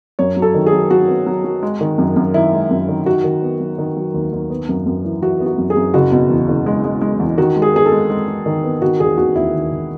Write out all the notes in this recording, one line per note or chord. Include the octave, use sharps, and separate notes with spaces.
F#2 C#5
F#3
A4
D#3
G#4
F#3
F#3 F#4
B3
F#3
F#3
G#3
D#3
F#2
F#2
D#3 E4
G#3
F#2
D#3
D#3 F#4
D#3
B3
F#3
D#3
F#3
D#2
D#2
B3
F#2
F#2
E3
E3 F#4
B3
F#4
F#2
G#4
F#2
F#1 F#4
B2
E2
F#1
G#3
G#3
G#3
E2
D#3 F#4
G#3
G#4
B3 G#4
A4
G#3
G#3
G#3
D#3
B3
D#3 F#4
E1 G#4
D#2 F#4
D#2 E4
D#3
E1